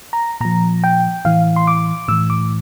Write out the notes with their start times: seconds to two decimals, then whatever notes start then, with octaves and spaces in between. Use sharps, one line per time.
0.13 A#5
0.40 A#2 F3 A#5
0.84 G5
1.25 A2 E3 F5
1.56 C6
1.67 D6
2.08 A2 E3 E6
2.30 D6